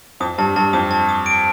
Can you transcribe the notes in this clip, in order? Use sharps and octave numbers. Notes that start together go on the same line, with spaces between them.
F2 D#6
G2 A5
G2 A5
F2 D#6
A5
D#6
D7